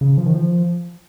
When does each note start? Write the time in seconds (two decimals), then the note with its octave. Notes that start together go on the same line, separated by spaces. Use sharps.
0.01 C#3
0.18 F3
0.26 D#3
0.35 F3